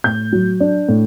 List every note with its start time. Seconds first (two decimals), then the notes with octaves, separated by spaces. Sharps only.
0.04 A2 G6
0.32 F#3
0.60 D4
0.89 A2